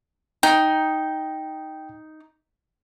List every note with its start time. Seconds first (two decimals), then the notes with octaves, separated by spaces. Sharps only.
0.43 D#4 G5